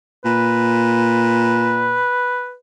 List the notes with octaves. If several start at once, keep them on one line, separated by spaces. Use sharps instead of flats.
A#2 B4